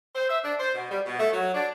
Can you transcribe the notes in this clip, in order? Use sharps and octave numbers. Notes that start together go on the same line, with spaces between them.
C5
E5
D4
C5
B2
G3
B2
A3
F#3
D4